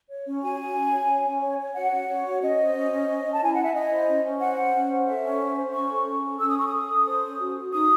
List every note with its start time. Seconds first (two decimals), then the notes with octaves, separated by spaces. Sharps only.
0.09 C#5
0.26 C#4
0.42 F#4 G#5
0.58 F#4
0.75 C#4
0.91 C#5
1.08 C#5
1.25 C#4
1.41 C#5
1.58 C#5
1.75 F#4 F#5
1.92 C#4
2.09 C#5
2.25 F#4
2.42 C#4 D#5
2.58 C5
2.74 C#4
2.91 C#4
3.08 C#4
3.25 C#4
3.33 A5
3.40 E4 G#5
3.54 E4 F#5
3.64 E5
3.74 E4 D#5
3.91 C5
4.08 C#4
4.23 C#4
4.40 C5 F#5
4.58 C#4
4.74 C#4
4.90 C5
5.06 A4 E5
5.23 C#4
5.41 C5
5.57 C5
5.74 C#4 C#6
5.90 A4
6.07 C#4
6.23 A4
6.40 C#4 E6
6.49 D#6
6.57 A4 C#6
6.66 D#6
6.73 A4
6.89 A4
7.06 C5
7.22 C#4
7.39 F#4
7.56 F#4
7.72 D#4 D#6